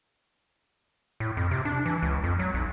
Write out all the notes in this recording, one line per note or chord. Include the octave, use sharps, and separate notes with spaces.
A2
F2
C3
D4
E3
C#2
F2
F#3
B1